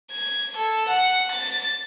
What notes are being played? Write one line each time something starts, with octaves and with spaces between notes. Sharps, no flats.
G#6
A4
F#5
A6